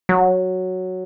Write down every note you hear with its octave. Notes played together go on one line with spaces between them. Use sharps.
F#3